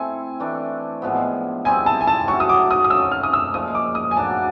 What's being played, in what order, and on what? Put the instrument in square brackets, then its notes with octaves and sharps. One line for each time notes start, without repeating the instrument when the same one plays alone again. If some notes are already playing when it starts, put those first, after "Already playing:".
Already playing: [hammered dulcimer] A3 C4 E4 A4 [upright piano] G#5
[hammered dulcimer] E3 A3 D4
A2 F3 G#3 B3
[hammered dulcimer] G3 C4 E4 G#4 [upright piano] G#5
[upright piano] A5
G#5
A5
[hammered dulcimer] F#3 A3 C#4 F#4 [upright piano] C#6
[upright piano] D#6
D6
D#6
D#6
[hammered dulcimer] A3 C#4 F4 [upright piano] E6
[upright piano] F6
D#6
E6
[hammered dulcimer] A#2 F3 G#3 [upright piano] D#6
[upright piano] D6
D#6
G#5
[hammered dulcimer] A2 F#3 A#3 D4 [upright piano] A5